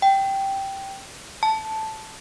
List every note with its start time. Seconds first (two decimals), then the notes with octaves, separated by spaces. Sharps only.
0.02 G5
1.43 A5